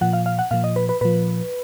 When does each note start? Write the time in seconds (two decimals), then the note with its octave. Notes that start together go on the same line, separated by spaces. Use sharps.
0.01 A#2 F3 F#5
0.13 F5
0.26 F5
0.39 F#5
0.51 A#2 F3 F5
0.64 D#5
0.76 B4
0.89 B4
1.01 A#2 F3 B4